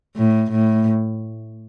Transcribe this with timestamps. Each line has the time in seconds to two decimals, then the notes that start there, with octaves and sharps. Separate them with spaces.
0.16 A2
0.51 A2